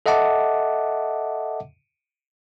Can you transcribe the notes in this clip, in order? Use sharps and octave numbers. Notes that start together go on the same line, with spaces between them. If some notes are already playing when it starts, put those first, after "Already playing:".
A4 D#5 E5 F#5 A5 D6